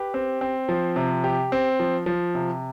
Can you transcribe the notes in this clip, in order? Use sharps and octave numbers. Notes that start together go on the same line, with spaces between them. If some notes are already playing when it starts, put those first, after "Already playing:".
Already playing: G4 B4
C4
C4
F3
C3
G4
C4
F3
F3
C3